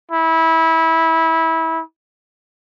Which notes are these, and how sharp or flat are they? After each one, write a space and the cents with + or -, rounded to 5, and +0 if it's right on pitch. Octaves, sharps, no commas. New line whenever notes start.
E4 -20